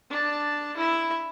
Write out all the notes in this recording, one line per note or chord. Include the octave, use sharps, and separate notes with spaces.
D4 A5
E4 E5